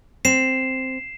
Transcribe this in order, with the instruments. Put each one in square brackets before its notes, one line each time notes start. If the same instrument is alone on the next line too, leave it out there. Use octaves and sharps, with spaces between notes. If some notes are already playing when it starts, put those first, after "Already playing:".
[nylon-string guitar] C4 [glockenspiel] C7 E7